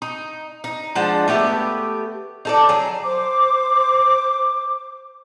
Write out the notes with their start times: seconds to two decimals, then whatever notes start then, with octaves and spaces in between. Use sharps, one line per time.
0.02 D#4
0.64 D#4
0.95 F3 G#3 D4 F#5
1.28 A3 B3 G4 E5
2.45 D#4 A4 D5
2.69 F#3 G#4
3.03 C5 D6